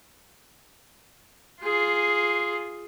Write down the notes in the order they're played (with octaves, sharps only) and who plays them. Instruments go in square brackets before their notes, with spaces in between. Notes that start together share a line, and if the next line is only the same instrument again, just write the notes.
[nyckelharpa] F4 G#4